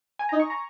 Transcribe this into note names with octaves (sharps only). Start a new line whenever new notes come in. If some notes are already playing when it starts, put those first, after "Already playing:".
G#5
D#4 A#5
C#6
A#5